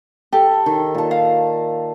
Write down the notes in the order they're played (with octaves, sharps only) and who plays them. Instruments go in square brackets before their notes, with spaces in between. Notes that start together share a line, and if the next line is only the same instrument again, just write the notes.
[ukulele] G4 [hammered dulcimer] A4
[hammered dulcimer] D#3
A#2 A5
[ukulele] F5